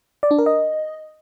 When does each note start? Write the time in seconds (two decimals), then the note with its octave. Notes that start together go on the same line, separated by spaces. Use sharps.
0.23 D5
0.31 D4
0.38 A#4
0.46 D#5